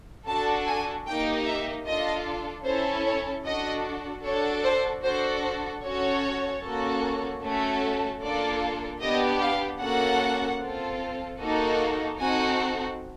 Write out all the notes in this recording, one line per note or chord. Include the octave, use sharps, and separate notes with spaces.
D4 F#4 A4 A5
G#5
A#3 D#4 G4 G5
E5
D4 F4 A4 D#5
C#4 E4 A4 C5
C#5
D4 F#4 A4 D#5
D4 F#4 A4 C#5
C5
D4 F#4 A4 C5
C5
C#4 F#4 A4 C#5
A#3 C#4 F#4 A4
A3 C#4 F#4 A4
A#3 D4 F4 A4 D5
B3 D4 G4 D#5
F5
A#3 C#4 F#4 A4 F#5
C4 F4 A4
A#3 D#4 F#4 A4
C4 D#4 F#4 A4 G#5